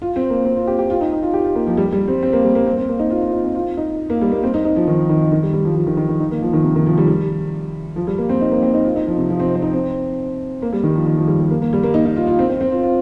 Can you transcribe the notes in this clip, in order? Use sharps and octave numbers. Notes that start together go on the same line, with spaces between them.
F4
C4
A#3
C4
F4
G4
G4
F4
D#4
D#4
F4
G4
F4
A#3
F3
G3
G3
C4
C4
A#3
G3
A#3
C4
C4
A#3
D#4
F4
F4
D#4
C4
F4
D#4
A#3
G3
A#3
C4
D#4
D#4
F3
D#3
D#3
D#3
G3
G3
F3
F3
D#3
D#3
D#3
D#4
A#3
F3
D#3
C3
D#3
F3
G3
G3
F3
G3
A#3
C4
D#4
A#3
C4
D#4
F4
D#4
F3
C3
F3
C4
C4
D#4
C4
A#3
G3
D#3
F3
D#3
F3
G3
G3
A#3
A#3
G3
A#3
D#4
D#4
F4
F4
C4
C4
C4
F4
F4